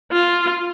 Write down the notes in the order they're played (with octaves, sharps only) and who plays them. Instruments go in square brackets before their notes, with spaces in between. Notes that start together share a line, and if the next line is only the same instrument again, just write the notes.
[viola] F4